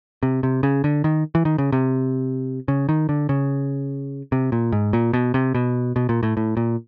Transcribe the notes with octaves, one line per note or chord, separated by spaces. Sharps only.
C3
C3
C#3
D3
D#3
E3
D#3
C#3
C3
C#3
D#3
D3
C#3
C3
A#2
G#2
A#2
B2
C3
B2
B2
A#2
A2
A2
A#2